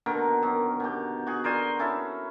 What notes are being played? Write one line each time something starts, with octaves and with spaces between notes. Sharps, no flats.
B2 D3 D#3 A#4
F#2
B2 G4
F#4 G#4
A#4 C5 D5 G#5
C#4 E4 A4